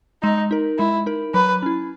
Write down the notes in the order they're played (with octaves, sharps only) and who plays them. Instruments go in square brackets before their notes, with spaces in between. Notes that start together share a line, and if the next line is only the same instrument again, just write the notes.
[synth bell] G#3 [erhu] D#4
[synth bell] D#4 A#4
[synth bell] G#3 [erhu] E4
[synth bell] D#4 A#4
[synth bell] F#3 [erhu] B4
[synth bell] C#4 E4